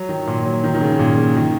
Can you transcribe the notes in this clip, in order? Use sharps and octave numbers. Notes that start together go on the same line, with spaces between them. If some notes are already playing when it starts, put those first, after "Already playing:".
Already playing: F#3
D#3
A#2
F#3
D#3
D#3
C#3
A#2
C#3
D#3